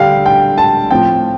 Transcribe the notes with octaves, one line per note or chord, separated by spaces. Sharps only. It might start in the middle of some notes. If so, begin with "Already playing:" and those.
Already playing: D3 G3 D4 F5 G5
G5
A5
A2 F3 C4 G5